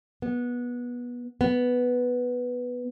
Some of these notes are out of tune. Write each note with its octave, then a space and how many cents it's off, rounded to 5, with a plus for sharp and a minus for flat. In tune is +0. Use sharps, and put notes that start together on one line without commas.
B3 -20
B3 +0